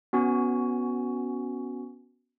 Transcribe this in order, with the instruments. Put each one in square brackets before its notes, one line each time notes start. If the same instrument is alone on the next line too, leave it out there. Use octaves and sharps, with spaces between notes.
[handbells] B3 C#4 F#4 G#5